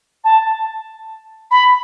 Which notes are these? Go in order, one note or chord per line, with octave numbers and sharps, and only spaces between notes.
A5
B5